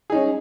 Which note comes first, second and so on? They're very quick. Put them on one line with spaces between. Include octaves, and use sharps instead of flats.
G#4 D#4 C#4